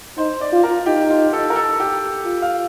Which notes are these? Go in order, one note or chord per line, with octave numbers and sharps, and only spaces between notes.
D#4 C5
D5
F4
A#4
D#4 G4
F4
A4
A#4
A4
G4
F4
F5